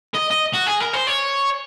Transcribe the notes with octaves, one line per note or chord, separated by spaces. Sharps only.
D#5
D#5
F#4
G#4
A#4
C5
C#5